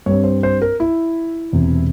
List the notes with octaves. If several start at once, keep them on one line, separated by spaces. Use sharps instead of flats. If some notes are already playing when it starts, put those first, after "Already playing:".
G2 G3 C4 C#5
C5
C5
A#4
E4
E1 E2 C3